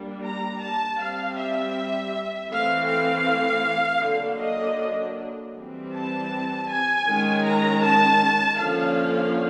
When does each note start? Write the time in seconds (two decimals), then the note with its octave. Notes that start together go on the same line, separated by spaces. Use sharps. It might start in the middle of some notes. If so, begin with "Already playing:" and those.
Already playing: G3 A#3 D4
0.22 A#5
0.60 A5
0.98 G3 C4 F5
1.36 E5
2.50 E3 A3 C4 F5
2.88 F5
4.02 D3 F#3 A#3 D4
4.40 D#5
5.54 E3 G3 C4
5.93 A5
6.69 G#5
7.07 D#3 G#3 C#4
7.45 A#5
7.83 A5
8.59 D3 F3 A#3 C#4 F5